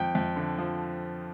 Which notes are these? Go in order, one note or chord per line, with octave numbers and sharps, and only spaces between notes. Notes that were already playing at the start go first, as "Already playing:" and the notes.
Already playing: F2 G5
F2
D3
F3